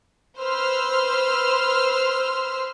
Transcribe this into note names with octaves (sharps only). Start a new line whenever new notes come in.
B4 C5 C6 E6 F6